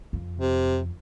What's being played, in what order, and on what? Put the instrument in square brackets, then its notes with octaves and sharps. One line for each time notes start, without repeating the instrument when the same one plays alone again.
[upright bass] F2
[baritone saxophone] C3